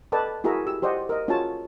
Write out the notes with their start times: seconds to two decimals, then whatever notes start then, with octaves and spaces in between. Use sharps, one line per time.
0.12 A4 B4 D5 D#5 G5 A5
0.44 E4 F#4 G#4 A#4 E5 A#5
0.67 G4 E6
0.82 G4 C5 D5 D#5 F#5
1.09 A#4 D#5
1.28 C#4 F4 F#4 G#4 C#5 A5